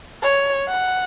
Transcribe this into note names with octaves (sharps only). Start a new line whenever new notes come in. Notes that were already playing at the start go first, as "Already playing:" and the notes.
C#5
F#5